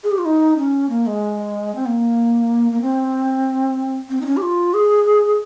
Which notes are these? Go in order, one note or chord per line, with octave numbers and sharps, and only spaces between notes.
G#4
G4
F4
D#4
C#4
A#3
G#3
C4
A#3
A#3
C4
C4
D#4
C#4
G4
F4
G#4